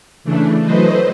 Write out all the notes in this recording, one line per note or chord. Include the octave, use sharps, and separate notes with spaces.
C#3 E3 A3 D4
E3 F#3 A3 B4 C5 D#5